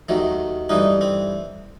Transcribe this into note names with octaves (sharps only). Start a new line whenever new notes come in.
D#2 D#3 F#3 A3
G2 E3 A3 D#4
C4